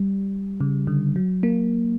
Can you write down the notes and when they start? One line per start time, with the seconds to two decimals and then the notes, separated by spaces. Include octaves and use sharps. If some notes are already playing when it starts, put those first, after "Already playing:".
Already playing: G3
0.61 C#3
0.87 D3
1.16 F#3
1.43 A#3